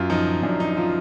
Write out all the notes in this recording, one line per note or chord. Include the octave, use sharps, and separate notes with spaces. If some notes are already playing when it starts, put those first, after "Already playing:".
Already playing: F#2 F4
F3 D#4
F#2 D4
D#4
F3 F4